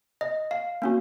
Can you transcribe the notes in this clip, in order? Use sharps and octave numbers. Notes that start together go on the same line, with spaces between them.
D#5
F5
A#3 C#4 F#4